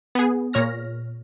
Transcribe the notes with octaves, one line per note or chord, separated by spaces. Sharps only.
B3 G#4
A#2 C#5 F6 A#6